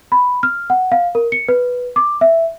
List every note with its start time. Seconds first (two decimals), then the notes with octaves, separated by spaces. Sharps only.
0.12 B5
0.43 F6
0.70 F#5
0.92 F5
1.15 A#4
1.32 C#7
1.48 B4
1.96 D6
2.21 E5